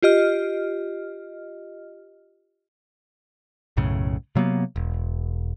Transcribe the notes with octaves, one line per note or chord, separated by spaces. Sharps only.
F4 G4 D#5 F6
B1 F#2 A2 C#3
C3 F#3 A#3 B3
E1